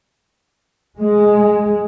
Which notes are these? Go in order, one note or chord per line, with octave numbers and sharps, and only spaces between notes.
G#3